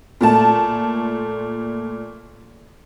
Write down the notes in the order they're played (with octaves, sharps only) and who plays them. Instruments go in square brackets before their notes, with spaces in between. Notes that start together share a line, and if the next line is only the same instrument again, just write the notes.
[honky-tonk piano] A#2 A3 A5